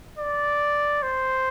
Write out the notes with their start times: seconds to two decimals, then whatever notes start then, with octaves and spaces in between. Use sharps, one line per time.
0.18 D5
1.03 C5